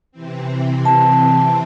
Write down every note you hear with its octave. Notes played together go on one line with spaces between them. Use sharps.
C3 E3 C4
A5